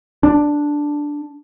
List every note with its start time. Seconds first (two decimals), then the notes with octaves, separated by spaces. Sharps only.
0.23 D4